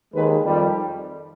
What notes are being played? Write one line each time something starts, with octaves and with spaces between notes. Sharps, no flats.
D#2 D#3 G#3 B4
F2 D#3 G3